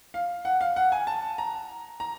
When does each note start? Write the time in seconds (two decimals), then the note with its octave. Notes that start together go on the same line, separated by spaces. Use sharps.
0.14 F5
0.45 F#5
0.61 F5
0.76 F#5
0.92 G#5
1.07 A5
1.38 A#5
2.00 A#5